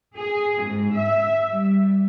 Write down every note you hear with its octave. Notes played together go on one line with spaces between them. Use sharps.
G#4
G#2
E5
G3